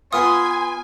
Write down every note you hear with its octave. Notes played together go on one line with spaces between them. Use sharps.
B3 F4 G#5 C6 D#6